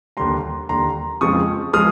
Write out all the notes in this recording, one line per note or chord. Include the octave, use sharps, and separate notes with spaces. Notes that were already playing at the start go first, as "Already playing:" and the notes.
D#2 D3 G3 A#5 C6
D#2 D3 G3 A#5 C6
F2 C#3 F3 G#3 C#6 D#6
F3 G#3 D#6 F6